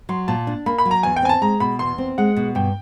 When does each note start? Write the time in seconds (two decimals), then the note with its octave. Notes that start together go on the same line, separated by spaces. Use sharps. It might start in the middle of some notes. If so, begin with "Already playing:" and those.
0.09 F#3 C6
0.28 A#2 A5
0.47 D4
0.66 A#3 B5
0.78 B5
0.85 F#3
0.91 A#5
1.03 E2 G#5
1.16 G5
1.22 C4 G#5
1.29 A5
1.42 G#3 A#5
1.60 B2 B5
1.79 E2 C6
1.98 C4
2.18 G#3 F#5
2.36 B2
2.55 G2 G5